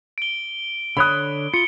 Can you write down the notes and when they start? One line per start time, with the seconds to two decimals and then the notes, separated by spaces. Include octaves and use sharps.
0.18 D7 G7
0.97 D3 C#5 B5 D#6 F#6
1.54 F4 C#7 G7